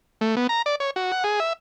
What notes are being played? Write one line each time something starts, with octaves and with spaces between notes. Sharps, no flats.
A3
B3
A#5
D5
C#5
F#4
F#5
G#4
E5